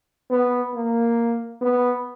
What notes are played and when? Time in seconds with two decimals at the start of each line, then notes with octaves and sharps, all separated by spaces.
0.30 B3
0.74 A#3
1.61 B3